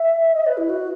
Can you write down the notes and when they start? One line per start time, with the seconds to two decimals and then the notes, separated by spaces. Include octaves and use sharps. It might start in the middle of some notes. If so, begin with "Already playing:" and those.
Already playing: E5
0.34 D#5
0.46 B4
0.57 E4
0.69 F#4